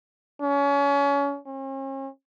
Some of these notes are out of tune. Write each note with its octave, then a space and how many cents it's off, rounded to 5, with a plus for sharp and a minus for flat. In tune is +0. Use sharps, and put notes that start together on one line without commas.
C#4 +30
C#4 -45